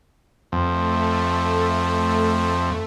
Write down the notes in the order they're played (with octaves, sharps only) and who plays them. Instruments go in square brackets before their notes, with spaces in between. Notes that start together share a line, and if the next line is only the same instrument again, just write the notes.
[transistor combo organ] F2 [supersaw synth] A3